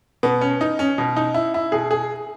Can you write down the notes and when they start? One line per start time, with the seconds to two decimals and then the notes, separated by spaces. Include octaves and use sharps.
0.23 B2 B3
0.41 C#4
0.61 D#4
0.79 C#4
0.98 B2
1.16 D#4
1.34 E4
1.54 E4
1.72 B2 G#4
1.91 G#4